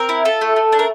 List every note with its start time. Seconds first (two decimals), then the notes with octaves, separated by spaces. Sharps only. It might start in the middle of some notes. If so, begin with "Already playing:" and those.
Already playing: C4 A#4
0.09 E4
0.25 F4 A4
0.41 A3
0.56 A3
0.72 D4
0.79 A#4